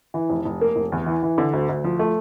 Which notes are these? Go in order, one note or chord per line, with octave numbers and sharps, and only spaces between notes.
E3
F1
F1
A#3
F1
E2
E3
E3
D3
D2
D2
F3
A3